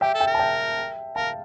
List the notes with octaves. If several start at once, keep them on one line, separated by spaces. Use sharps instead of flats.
G4 E5 G5
A4
E5 G5
A#4
A5
E5 G5
A#4 F5 A5